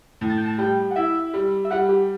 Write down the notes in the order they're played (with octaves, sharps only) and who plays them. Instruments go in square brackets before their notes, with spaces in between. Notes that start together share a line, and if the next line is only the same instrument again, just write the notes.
[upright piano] A2
[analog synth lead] A5
G5
A5
[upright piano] G3 [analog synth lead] G5
[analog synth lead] F#5
[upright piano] E4 [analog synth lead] E5
[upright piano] G3
[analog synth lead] E5
[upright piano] G3 [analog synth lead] F#5
[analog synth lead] G4